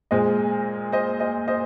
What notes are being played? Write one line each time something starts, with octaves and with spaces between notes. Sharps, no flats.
A#2 G#3 C5 D#5
C5 D#5
C5 D#5
C5 D#5